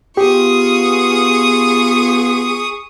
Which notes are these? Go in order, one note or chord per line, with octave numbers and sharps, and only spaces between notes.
B3 F4 G4 G#4 C#6 D#6